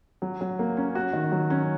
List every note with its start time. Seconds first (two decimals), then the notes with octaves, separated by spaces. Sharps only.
0.22 F#3
0.41 F#3
0.59 A#3
0.77 C#4
0.95 F#4
1.13 D#3
1.32 F#3
1.50 C#4